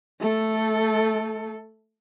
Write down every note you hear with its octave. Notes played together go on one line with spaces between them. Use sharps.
A3 A4